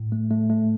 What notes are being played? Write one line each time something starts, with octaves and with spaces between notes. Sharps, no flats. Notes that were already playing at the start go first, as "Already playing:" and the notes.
Already playing: A2
A3
A3
A3